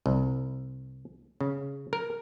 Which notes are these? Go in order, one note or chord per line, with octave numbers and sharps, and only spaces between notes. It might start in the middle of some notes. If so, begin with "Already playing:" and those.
C2
C#3
A#4